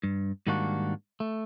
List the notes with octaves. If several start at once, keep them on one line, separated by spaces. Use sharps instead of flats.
G2
G#2 D#3 G3 A#3 D4 F#4
A3